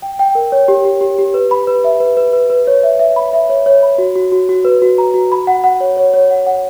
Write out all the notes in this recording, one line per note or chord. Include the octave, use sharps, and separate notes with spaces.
G5
G5
A#4
C#5
G4
G4
G4
G4
B4
B5
B4
E5
B4
B4
B4
B4
C#5
E5
E5
B5
E5
C#5
C#5
B5
F#4
F#4
F#4
F#4
B4
F#4
A#5
F#4
B5
F#5
F#5
C#5
C#5
C#5
F#5
F#5